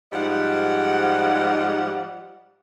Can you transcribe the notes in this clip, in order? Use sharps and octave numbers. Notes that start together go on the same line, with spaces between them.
G#2 F3 G3 D#5 F#5